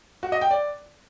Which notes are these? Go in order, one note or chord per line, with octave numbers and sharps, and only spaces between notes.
F#4
D#5
G5
D5